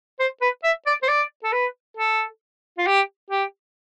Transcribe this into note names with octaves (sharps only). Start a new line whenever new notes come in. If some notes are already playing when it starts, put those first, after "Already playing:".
C5
B4
E5
D5
C5
D5
A4
B4
A4
F4
G4
G4